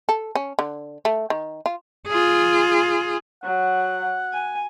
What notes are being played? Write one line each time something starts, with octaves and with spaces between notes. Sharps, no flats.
A4
C#4
D3
A3
D#3
F4
F4 G#4
F#3 F#5
G#5